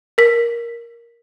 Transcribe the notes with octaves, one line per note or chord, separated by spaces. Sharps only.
A#4 B6